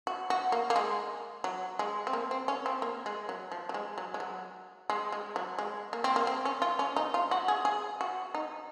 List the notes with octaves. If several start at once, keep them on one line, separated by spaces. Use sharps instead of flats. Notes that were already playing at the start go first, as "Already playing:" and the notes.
F#4
F#4
A#3
A#3
G#3
F#3
G#3
C4
A#3
C4
C#4
C4
A#3
G#3
F#3
F3
F#3
G#3
F#3
G#3
F#3
G#3
G#3
F#3
G#3
A#3
C4
A#3
C4
C#4
F4
C#4
D#4
F4
F#4
G#4
G#4
F#4
D#4